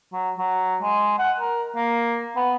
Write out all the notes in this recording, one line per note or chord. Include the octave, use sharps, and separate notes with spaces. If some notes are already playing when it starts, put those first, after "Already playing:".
F#3
F#3
G#3
F#5
A#4
A#3
B3